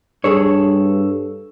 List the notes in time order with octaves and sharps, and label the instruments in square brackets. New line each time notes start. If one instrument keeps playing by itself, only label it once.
[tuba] G2 [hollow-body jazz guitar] G#4 A4 C#5